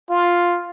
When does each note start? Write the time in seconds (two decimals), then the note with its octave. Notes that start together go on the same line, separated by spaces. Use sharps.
0.10 F4